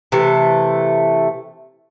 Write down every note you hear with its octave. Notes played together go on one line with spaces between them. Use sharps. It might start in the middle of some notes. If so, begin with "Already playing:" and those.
C3 E3 A3